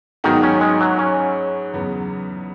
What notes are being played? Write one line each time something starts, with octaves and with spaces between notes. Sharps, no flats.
G#2 D#3 F#3 B3 D#4 F#4
C#4
G#3
F#3
C#4
E2 C#3 F#3 B3